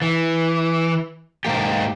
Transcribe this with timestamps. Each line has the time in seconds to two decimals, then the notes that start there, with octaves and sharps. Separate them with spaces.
0.02 E3
1.45 G#2 A#3 G4